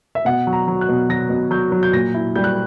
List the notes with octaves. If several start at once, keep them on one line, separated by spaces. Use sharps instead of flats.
E5
B2 F#5
F#3
A#5
F#3
F#6
B2
F#3 A#6
B2
F#3 G6
F#3
G6
A#2 A#6
E4
G3 G6
F#6